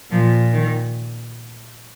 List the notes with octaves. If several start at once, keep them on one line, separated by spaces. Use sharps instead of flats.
A#2 F3
D#3